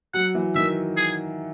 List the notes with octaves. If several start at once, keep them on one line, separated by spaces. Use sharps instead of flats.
F#3 F#5
E3
D#3 E5
G#4